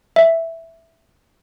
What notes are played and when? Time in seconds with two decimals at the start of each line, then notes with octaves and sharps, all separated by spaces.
0.16 E5